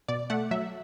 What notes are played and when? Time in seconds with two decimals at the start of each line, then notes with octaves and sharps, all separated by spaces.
0.08 B2 D5
0.30 A3 F#5
0.51 F#3 E5